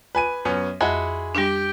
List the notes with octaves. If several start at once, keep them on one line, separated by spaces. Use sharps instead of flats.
B4 G#5 D#7
F#2 B3 C#4
F2 G#3 E4 F#4 G#4
G3 D4 G4 G5